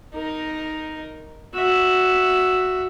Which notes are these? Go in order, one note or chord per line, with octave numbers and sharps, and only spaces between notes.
D#4 A#4
F#4 E5